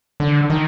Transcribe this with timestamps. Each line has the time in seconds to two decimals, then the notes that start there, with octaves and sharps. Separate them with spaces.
0.20 D3
0.50 D#3